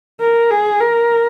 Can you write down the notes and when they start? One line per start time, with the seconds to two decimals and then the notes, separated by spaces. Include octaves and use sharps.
0.20 A#4
0.50 G#4
0.80 A#4